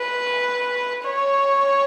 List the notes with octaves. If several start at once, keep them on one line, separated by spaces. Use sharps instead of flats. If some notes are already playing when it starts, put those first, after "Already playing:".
Already playing: B4
C#5